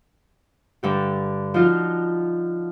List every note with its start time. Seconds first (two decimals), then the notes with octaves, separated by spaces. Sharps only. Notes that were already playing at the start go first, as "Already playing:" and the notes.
0.83 G2 D3 G4
1.54 F3 D#4 F4 F#4